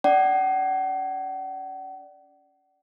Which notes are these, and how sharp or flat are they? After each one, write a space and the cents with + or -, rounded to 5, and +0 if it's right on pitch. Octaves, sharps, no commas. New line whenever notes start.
C#4 +35 D5 +0 F#5 +40